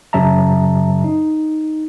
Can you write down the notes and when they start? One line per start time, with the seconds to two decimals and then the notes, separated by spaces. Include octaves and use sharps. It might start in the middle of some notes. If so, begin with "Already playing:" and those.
0.13 F#2 C#3 F#3 E5 A5 A#5
1.04 D#4